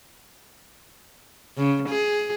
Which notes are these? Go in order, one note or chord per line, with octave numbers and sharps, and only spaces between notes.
C#3
G#4